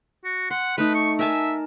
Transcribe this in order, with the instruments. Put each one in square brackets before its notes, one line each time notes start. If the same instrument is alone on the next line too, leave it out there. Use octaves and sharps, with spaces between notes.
[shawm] F#4
[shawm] F#5 [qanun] C6
[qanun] A3 D#4 [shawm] B4
[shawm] C#6
[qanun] A#4 G#5 A5 [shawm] E5